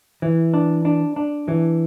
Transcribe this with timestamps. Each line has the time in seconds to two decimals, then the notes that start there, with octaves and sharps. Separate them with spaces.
0.22 E3
0.54 D4
0.85 D4
1.16 D4
1.48 E3